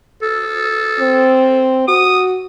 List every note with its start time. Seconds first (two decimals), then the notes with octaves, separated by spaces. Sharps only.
0.22 A4
1.00 C4
1.88 F#4 D#6